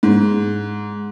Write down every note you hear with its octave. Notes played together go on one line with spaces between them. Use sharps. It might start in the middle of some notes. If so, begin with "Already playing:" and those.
G#2